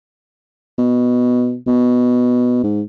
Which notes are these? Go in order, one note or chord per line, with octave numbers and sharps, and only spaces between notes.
B2
B2
G#2